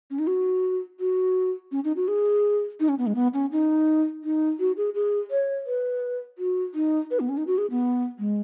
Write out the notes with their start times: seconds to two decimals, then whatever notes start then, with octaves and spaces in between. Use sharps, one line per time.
0.10 C#4
0.19 D#4
0.28 F#4
1.00 F#4
1.72 C#4
1.84 D#4
1.96 F#4
2.08 G#4
2.80 D#4
2.89 C#4
2.98 B3
3.07 G#3
3.15 B3
3.34 C#4
3.52 D#4
4.24 D#4
4.60 F#4
4.77 G#4
4.95 G#4
5.31 C#5
5.66 B4
6.38 F#4
6.74 D#4
7.11 B4
7.20 B3
7.29 C#4
7.37 D#4
7.47 F#4
7.58 G#4
7.71 B3
8.19 G#3